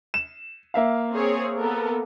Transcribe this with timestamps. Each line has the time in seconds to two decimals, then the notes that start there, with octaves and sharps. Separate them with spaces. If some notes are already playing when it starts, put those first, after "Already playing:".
0.14 E7
0.74 A#3 E5 F5
1.12 C4 G#4 C#5
1.58 B3 A4 A#4